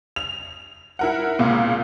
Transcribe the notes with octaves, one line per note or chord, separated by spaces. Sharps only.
F7
E4 A#4 F#5
C#2 A#2